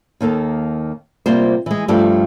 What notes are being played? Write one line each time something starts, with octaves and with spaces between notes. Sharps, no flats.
D#2 D#3 A#3 A4
C3 G3 A#3 F4 C5
E3 G#3
G2 F3 A3 G4 A4